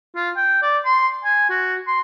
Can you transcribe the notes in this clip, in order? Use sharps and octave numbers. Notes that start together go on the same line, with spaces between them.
F4
G5
D5
C6
G#5
F#4
C6